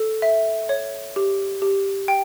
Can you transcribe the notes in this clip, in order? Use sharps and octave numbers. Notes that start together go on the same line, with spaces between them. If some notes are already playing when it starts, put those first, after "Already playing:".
Already playing: A4
E5
C#5
G4
G4
G5